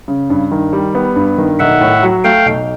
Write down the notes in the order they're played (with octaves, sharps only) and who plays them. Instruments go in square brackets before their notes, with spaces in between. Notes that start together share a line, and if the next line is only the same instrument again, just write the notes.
[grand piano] C#3
G2
D#3
G3
B3
G2
D#3
[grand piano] B1 [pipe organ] E5 F#5
[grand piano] A2
F#3
[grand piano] A3 [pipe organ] F5 G5
[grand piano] B1